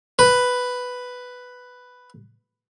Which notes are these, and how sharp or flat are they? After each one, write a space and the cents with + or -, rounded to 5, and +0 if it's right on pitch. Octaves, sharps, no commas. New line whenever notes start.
B4 +5